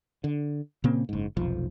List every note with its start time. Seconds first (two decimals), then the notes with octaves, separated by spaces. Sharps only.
0.24 D3
0.84 A#2 C#3 A#3 C4
1.09 F#1 G#2
1.37 F1 B1 F3